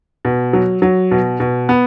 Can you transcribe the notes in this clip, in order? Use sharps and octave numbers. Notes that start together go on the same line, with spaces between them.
B2
F#3
F#3
B2
B2
B3